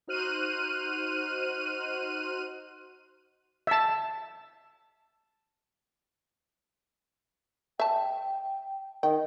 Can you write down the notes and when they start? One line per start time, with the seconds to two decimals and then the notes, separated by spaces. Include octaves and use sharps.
0.07 D#4 F#4 C5 F6 F#6 D#7
3.67 E5 A5
7.80 E5 G5 A5
9.03 D#3 G5